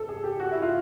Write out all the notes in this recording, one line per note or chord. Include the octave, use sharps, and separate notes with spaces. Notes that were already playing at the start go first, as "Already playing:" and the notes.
Already playing: A4
G#4
G4
F#4
E4
F4